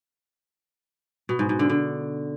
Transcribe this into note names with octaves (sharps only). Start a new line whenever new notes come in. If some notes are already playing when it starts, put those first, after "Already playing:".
B2
G#2
G#2
D3
D3